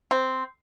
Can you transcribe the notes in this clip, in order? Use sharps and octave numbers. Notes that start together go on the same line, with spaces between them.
C4